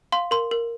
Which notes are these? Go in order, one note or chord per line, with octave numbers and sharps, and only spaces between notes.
F5 C6
A#4 C6
A#4